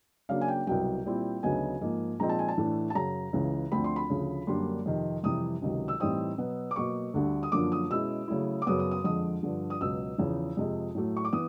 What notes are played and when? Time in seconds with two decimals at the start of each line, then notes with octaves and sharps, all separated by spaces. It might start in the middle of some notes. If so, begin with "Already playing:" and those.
0.29 C#3 F#3 A#3 D4 F5
0.41 G#5
0.48 G5
0.67 C2 B2 F#3 G5
1.05 A#2 G3 C4 E4
1.43 D2 C#3 F#3 B3 D#4 G#5
1.81 G#2 F3 A#3 D#4
2.19 A#2 F3 G#3 C4 D#4 A#5
2.29 A5
2.39 G#5
2.48 A5
2.57 A2 E3 A3 D4
2.90 A5
2.95 F#2 C#3 F#3 A#5
3.33 C#2 C#3 E3
3.71 D2 D3 F3 A3 C4 B5
3.84 C6
3.96 B5
4.10 D2 C#3 F3
4.47 F#2 D3 G3 A#3 D4 C6
4.86 F2 C3 D#3
5.23 F2 C3 E3 G3 D#6
5.62 C#2 C3 D#3 F#3
5.88 E6
6.00 A2 E3 G3 C4 D#4 D#6
6.38 B2 F#3 B3
6.71 D6
6.76 B2 F#3 A#3 C#6
7.14 D2 D3 G3
7.43 D#6
7.52 F#2 D3 F3 A#3 D4 D6
7.72 D#6
7.90 B2 G#3 C#4 E4 E6
8.28 C#3 F#3 A3 C#4 E4
8.62 D6
8.66 F#2 C#3 F#3 B3 D#6
8.79 D#6
8.91 D#6
9.04 F2 D3 F3 G#3 D#6
9.43 G2 D3 F3
9.70 D#6
9.81 C#2 B2 F#3 E6
10.18 E2 C#3 F3
10.57 F2 C3 F3 G#3
10.95 A2 F#3 A3
11.17 C#6
11.25 D6
11.33 E3 B3 D#6